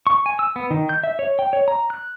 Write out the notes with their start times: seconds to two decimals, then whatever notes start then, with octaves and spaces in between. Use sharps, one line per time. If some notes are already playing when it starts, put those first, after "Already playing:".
0.07 C#6
0.26 G#5
0.39 E6
0.56 B3
0.71 D#3
0.89 G6
1.03 E5
1.19 C#5
1.39 G5
1.53 C#5
1.68 A#5
1.90 F#6